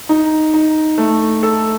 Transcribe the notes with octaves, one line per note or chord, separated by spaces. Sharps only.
D#4
D#4
A3
A4